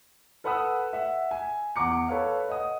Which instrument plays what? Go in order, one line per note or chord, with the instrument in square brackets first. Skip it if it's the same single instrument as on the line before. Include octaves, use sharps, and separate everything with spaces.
[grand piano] A4 B4 F#5 B5 D#6 E6
E5 F#5
G#5
E2 F#5 A#5 D6 C#7
A4 B4 C#5 F5
D#5 F#5 D#6